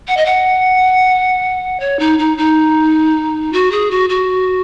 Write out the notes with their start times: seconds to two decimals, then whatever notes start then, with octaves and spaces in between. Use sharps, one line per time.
0.07 F#5
0.17 D#5
0.25 F#5
1.80 C#5
1.99 D#4
2.18 D#4
2.37 D#4
3.53 F#4
3.71 G#4
3.90 F#4
4.09 F#4